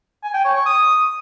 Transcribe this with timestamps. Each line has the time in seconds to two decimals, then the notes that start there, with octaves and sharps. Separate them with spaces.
0.23 G#5
0.34 G5
0.45 C#5
0.55 C#6
0.66 D#6